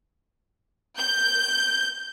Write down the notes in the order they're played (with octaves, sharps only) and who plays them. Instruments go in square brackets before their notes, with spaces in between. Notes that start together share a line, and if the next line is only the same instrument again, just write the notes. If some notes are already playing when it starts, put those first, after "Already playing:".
[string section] G6